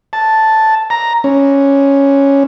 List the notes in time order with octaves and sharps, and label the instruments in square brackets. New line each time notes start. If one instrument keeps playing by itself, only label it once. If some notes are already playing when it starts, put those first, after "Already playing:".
[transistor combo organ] A5
A#5
C#4